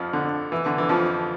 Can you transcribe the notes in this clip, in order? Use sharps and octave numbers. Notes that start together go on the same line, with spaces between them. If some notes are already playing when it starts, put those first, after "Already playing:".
Already playing: F2 F3
D3
E3
D3
E3
F2 F3